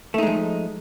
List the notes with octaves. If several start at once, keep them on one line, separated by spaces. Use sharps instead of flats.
F3 G#3 A3 D#4